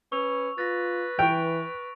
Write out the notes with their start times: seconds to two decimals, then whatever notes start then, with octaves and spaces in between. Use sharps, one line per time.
0.12 C#4 B4 C#6 E6 F7
0.58 F4 B4 A6 A#6
1.19 E3 G5 C#6 D7 F7